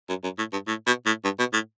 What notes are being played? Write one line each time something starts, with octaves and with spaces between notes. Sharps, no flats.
F#2
F#2
A2
G2
A2
B2
A2
G2
B2
A2